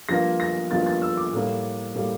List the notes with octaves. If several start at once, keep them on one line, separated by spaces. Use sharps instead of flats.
G2 F3 A#3 A#6
A#6
G2 F3 A#3 A6
A6
E6
D6
A2 G3 A#3
A2 G3 A#3